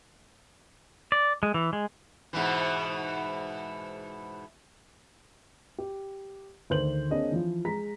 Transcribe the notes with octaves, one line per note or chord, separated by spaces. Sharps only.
D5
G#3
E3
G#3
G#2 B2 E3
G4
D2 D#3 C5 G6 F#7
A#3 C4 D4 G#4 C#5 D#5
E3 F3 F4
G#3 A#5 B6